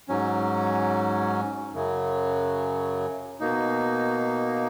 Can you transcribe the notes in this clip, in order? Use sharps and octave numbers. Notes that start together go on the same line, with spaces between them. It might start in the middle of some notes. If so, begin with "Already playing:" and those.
G#2 F#3 C#4
F#2 C#3 F#3
B2 A#3 D#4